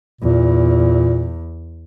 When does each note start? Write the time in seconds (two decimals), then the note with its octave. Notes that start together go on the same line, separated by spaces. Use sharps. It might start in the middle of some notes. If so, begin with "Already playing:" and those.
0.21 E2 A#2